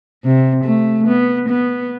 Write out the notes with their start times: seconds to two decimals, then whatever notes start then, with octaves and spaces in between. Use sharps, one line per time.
0.24 C3
0.64 A3
1.07 B3
1.49 B3